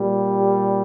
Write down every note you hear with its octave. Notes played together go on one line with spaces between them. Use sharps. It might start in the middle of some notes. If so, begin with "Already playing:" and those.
Already playing: A#2 G3
G4